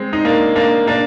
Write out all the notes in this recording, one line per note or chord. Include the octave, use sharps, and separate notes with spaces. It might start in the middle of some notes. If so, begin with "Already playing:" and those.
Already playing: G#3 C4
D#4
A#3 D4
A#3 D4
A#3 D4